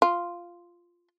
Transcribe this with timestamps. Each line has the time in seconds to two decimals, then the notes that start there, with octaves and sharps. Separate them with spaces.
0.02 F4